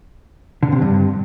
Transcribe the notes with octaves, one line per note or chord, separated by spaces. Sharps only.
D3
C3
G2